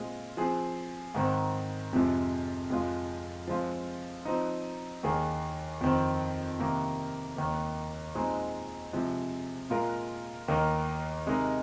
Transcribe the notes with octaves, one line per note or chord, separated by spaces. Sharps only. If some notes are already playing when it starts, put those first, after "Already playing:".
Already playing: A#2 G#3 C4 F4
F3 C4 G#4
G#2 D#3 C4
F2 C3 F3 G#3
F2 F3 G#3 F4
F3 G#3 C4 F4
F3 C4 D#4
D#2 D#3 A#3 G#4
F2 D#3 C4
C3 D#3 A#3
D#2 D#3 A#3
A#2 G#3 C4 D#4 G#4
C3 F3 G#3
A#2 G#3 F4 A#4
D#2 D#3 A#3 D#4 A#4
C3 G#3 D#4 A#4